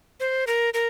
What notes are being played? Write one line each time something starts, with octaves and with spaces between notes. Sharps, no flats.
C5
A#4
A#4